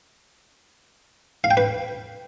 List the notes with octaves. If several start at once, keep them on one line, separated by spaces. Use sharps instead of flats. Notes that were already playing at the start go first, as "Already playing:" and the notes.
F5
G5
B4